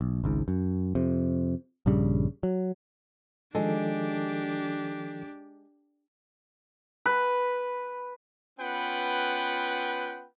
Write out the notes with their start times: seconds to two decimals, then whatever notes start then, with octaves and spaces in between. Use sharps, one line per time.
0.01 B1
0.24 G#1 C#2 G#2
0.48 F#2
0.95 F2 C3
1.86 A#1 G2 C#3 G3
2.43 F#3
3.55 D#3 F3 G#3 D4 G4 A4
7.06 B4
8.59 B3 C#4 F4 B4 F#5 G5